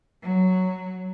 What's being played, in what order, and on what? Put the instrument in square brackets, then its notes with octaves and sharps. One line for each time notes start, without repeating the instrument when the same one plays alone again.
[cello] F#3